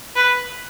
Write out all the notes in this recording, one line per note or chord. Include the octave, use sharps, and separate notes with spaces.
B4